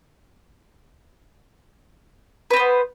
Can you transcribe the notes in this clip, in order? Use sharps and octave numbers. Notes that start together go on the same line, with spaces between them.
B3 C4 B4 C5